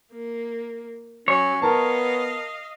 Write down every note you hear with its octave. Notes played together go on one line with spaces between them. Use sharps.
A#3
F#3 C#4 C#5
B3 A#4 D#5 F5 A5